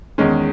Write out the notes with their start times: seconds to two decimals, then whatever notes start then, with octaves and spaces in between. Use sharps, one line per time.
0.18 E2 D#3 G#3 C#4